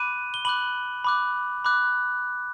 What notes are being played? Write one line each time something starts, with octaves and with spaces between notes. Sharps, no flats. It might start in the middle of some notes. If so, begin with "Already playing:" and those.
Already playing: B5 D6 F#6 D#7
G7
B5 D6 F#6 F#7
B5 D6 F#6
B5 D6 F#6